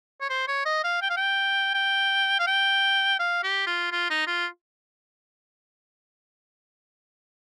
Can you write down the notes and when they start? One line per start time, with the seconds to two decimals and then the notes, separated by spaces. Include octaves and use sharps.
0.21 C#5
0.30 C5
0.48 C#5
0.65 D#5
0.84 F5
1.02 G5
1.10 F5
1.17 G5
1.74 G5
2.39 F5
2.47 G5
3.19 F5
3.43 G4
3.67 F4
3.92 F4
4.10 D#4
4.27 F4